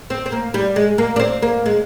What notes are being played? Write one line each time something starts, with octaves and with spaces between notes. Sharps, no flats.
C4
C4
A#3
G3
G#3
A#3
D4
C4
A#3
G#3